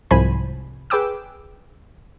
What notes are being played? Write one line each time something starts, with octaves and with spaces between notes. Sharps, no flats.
C2 G#2 F3 C5 G#5 B5
G#4 B4 G5 D6 E6